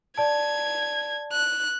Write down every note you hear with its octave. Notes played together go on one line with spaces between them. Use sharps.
D5 A5 G#6
F#6